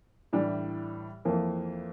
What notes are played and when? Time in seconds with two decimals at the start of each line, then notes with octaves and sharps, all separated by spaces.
0.33 A2 E3 G3 D4
1.25 F2 E3 A#3